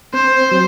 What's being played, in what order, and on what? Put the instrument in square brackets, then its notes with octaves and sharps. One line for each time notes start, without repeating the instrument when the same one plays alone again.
[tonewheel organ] C4 [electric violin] C5
[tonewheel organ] F#3